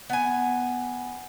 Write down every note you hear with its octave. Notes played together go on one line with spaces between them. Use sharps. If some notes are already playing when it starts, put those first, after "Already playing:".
B3 G#5